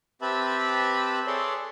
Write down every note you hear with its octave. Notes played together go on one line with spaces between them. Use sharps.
C4 G4 B4 E5 A5 B5
G#4 A4 C#5 D5 C6